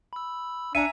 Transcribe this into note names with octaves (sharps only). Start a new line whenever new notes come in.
B5 E6
D4 E5 G#5 A#5 C#7 D#7